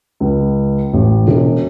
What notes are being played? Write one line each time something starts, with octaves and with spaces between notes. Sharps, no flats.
C#2
A1
E1